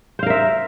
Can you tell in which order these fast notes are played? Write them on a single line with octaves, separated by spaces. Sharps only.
C5 F5 A#4 E5